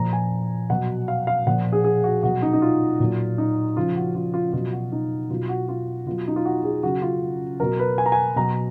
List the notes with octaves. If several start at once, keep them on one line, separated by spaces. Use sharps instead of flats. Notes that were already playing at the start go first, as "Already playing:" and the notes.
Already playing: A#2 F3 A#5
G#5
B2 F#3 F#5
F5
F5
A#2 F3 F#5
G#4
G#4
F#4
B2 F#3 F#4
D#4
D#4
F4
A#2 F#3
D#4
C#3 F3 F4
F#4
F4
F4
B2 F#3 F4
F#4
D#4
B2 F#3 F4
F#4
F4
B2 F#3 F4
D#4
F4
F#4
G#4
C#3 F#3 F#4
F4
B2 F#3 A#4
B4
G#5
A#5
G#5
B2 F#3 A#5